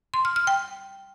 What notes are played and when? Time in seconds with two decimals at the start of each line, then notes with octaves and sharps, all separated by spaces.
0.14 C6
0.25 F6
0.36 F6
0.47 G5